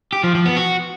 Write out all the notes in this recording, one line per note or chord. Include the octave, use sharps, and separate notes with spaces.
G4
F3
F3
B3
F#4